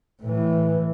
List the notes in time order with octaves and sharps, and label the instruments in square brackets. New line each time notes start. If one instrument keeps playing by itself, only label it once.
[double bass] A2 E3